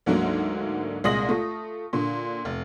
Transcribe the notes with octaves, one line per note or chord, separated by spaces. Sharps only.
D2 G#2 D3 F#3 A#3
C2 A#2 G#3 D#6 A#6 F#7
A3 F4
A#2 D3
F1